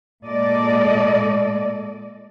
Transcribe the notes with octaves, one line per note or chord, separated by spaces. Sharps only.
A#2 G#3 A4 D5 D#5